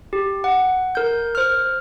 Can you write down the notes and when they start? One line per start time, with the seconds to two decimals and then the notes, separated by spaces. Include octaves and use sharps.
0.13 G4
0.44 F#5
0.95 A#4 G6
1.35 C5 F6